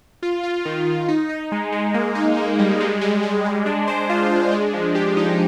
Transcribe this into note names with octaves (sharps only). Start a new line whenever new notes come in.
F4
F4
D#3
D#3
D#4
D#4
G#3
G#3
A#3
D#4
A#3
G3
G#3
G#3
G#3
G#3
D4
C5
F4
D4
G#3
F3
G4
D#4